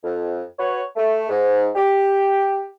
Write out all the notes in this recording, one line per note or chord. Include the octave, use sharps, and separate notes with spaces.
F2
F#4 B4 C#5
A3
G#2
G4